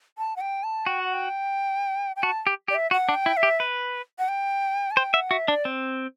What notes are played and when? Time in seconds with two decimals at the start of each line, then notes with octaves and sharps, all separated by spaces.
0.18 A5
0.36 F#5
0.41 G5
0.64 A5
0.86 F#4 G5
1.00 F#5
1.13 G5
2.16 G5
2.23 F#4 A5
2.47 G4
2.68 G4 D5
2.75 E5
2.91 F#4 F#5
3.09 D4
3.14 G5
3.26 E4
3.37 E5
3.43 G4
3.60 B4
4.19 F#5
4.28 G5
4.91 A5
4.97 C5 G5
5.14 E5 F#5
5.31 F#4 E5
5.48 D4 D5
5.65 C4